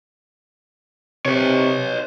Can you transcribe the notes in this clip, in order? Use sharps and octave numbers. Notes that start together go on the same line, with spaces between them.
C3 B4 C#5